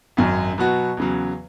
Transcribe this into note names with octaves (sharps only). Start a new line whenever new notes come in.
G#1 F#2 F#3
B2 F#3 B3 F#4
E2 C#3 F#3